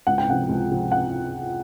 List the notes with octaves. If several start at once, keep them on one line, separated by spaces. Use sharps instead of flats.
C#2 F#5
G5
C3 F3 F#5
C#2
C3 F3
F#5